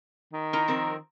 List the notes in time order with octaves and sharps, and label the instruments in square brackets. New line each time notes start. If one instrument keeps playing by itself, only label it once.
[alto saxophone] D#3
[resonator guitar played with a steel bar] D#4 E4 A#4
F3 C4 A#4